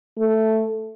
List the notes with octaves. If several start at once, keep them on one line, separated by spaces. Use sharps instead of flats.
A3